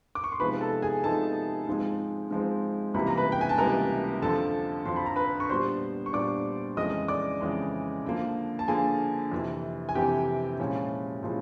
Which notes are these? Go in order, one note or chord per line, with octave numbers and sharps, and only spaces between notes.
D6
C#6
C6
C3 F3 G#3 B3 D#4 B4 B5
A4 A5
G#4 G#5
C3 F3 G#3 B3 D#4 A4 A5
G#2 F3 G#3 C4
G#2 F3 G#3 C4
C#2 C3 E3 G3 A#3 B5
A#5
B4 B5
G5
G#5
A5
C#2 C3 E3 G3 A#3 A#4 A#5
F2 D3 F3 A4 A5
F2 D3 F3 C6
B5
A#5
B4 B5
C#6
A#2 G3 B3 D4 C5 C6
C#6
A#2 G3 B3 D4 D5 D6
F2 C#3 E3 G#3 D#5 D#6
D5 D6
F2 C#3 E3 G#3
D3 F3 A#3
A5
D3 F3 A#3 G#4 G#5
F2 C3 E3
G#5
F2 C3 E3 G4 G5
A#2 F3 G#3 C#4 E4
A#2 F3 G#3 C#4 E4